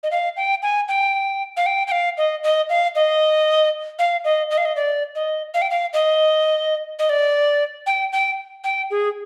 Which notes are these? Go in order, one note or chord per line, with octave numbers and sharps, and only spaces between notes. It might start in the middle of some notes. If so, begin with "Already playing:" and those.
D#5
F5
G5
G#5
G5
F5
G5
G5
F5
D#5
D#5
F5
D#5
F5
D#5
D#5
F5
D#5
D5
D#5
F5
G5
F5
D#5
D#5
D5
G5
G5
G5
G#4